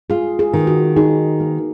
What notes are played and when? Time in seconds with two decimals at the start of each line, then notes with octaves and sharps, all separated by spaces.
0.10 F4 G#4
0.39 G#4
0.53 D#3
0.67 F#4
0.96 D#4 G#4
1.40 A#3